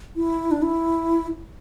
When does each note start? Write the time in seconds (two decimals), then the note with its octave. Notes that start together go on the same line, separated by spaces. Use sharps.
0.16 E4
0.51 D4
0.62 E4